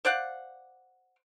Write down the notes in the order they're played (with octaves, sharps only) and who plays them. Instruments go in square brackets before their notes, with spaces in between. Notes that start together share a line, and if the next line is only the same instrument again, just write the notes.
[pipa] C5 D5 F5 F#5